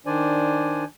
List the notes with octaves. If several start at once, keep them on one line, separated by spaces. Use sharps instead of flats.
D#3 D4 C5 D5 G#5